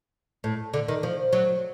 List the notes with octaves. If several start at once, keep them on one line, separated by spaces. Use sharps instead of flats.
A2
D3
D#3
F3
F#3